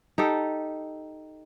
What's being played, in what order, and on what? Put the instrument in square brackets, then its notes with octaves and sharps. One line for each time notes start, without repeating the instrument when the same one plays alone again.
[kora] D#4 G4 A4